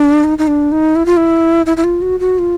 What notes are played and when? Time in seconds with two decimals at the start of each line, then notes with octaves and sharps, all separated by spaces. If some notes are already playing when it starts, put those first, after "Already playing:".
Already playing: D4
0.24 D#4
0.38 D#4
0.47 D4
0.72 D#4
0.96 E4
1.06 F4
1.17 E4
1.66 E4
1.77 E4
1.84 F4
2.02 F#4
2.20 F#4
2.39 F4